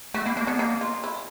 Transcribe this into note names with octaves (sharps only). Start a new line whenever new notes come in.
A3 F#4
A#3 E4
A#3 D4
B3 D4
A#3 D#4
F4
E4